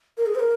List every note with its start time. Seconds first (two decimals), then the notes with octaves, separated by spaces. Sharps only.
0.17 A#4
0.26 G#4
0.35 C5
0.40 A#4